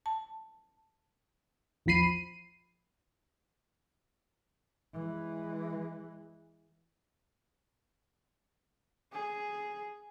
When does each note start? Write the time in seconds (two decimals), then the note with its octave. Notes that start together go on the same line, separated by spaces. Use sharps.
0.06 A5
1.86 A#1 E2 F3 B5 C7 D#7
4.93 E3 G#3
9.13 G#4